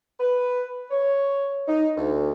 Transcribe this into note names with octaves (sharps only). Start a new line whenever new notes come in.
B4
C#5
D#4
D2